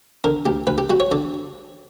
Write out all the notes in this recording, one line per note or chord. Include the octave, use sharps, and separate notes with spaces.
D3 A#4
D2 G4
D2 B4
G4
G3 F#4
C#5
D3 D5